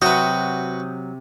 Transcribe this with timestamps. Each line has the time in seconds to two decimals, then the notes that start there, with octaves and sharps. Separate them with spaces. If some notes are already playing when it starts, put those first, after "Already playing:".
0.02 C3 F#3 C4 F#4 B4 D#6 G6